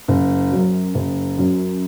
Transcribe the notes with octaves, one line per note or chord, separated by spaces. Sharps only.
F#1
F#2 F#3
F#1
F#2 F#3